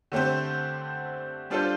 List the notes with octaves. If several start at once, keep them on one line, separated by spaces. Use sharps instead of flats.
D3 A3 C4 G4 C5
G3 D4 F4 A4 C5